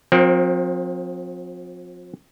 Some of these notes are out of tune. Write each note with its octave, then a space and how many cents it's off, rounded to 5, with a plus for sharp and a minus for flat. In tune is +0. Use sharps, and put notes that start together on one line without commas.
F3 +40 C4 +10 A#4 +0